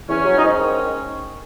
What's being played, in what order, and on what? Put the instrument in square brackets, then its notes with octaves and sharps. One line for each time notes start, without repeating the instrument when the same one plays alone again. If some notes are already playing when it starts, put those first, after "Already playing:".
[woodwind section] E2 C#4
F#3
D#4
G#2 C#4
D#3